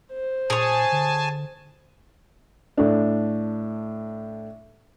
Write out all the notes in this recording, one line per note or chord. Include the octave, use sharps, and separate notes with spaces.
C5
A#2 G#4 C#5 G#5 A5
D3
A2 D4